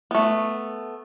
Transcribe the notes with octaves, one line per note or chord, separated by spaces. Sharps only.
A3 B3